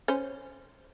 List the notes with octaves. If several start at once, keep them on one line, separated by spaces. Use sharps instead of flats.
C#4 C5